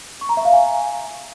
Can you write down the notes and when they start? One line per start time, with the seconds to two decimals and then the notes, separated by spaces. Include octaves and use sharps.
0.21 C#6
0.29 A#5
0.37 E5
0.45 F5
0.53 G#5